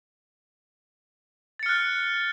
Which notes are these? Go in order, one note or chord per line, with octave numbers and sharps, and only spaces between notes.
F6 F#6 A6 C#7